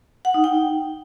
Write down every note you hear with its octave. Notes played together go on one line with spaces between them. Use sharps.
F#5
D#4
G5